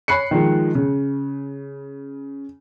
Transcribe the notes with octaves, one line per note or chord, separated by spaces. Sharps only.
C#5 B5 F#6 C7 C#7
D#3 F3 G#3
C#3